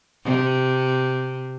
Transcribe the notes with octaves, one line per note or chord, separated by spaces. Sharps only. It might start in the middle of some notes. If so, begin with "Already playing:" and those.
C3